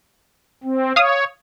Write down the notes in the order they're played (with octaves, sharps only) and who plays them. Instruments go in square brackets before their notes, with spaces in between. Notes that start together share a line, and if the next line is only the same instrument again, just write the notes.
[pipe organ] C4
[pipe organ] C#5 [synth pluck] F5 D#6